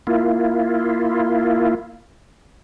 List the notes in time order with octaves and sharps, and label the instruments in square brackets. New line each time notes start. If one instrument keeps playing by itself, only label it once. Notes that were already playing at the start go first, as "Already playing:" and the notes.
[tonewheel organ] A#3 E4 F4